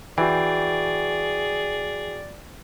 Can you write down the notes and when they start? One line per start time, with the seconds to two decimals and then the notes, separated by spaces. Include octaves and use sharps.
0.18 E3 F#4 G#4 D5 G5